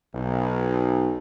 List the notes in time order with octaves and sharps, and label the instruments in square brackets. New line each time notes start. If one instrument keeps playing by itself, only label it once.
[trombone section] B1